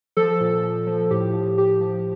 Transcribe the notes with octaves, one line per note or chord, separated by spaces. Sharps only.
F3 A4
A#2
F3
F3
A2 G4
F3
F3 G4
F3